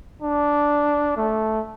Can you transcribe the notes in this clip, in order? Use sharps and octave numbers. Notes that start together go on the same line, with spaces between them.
D4
A3